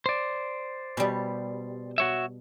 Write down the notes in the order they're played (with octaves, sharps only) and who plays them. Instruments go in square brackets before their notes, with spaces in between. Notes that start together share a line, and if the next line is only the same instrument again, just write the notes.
[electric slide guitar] C5 D5
[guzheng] B2 G3
[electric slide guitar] F#4 C#5 E5